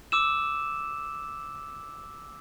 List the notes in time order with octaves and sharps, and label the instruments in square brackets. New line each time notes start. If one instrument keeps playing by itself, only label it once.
[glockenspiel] D6 E6 E7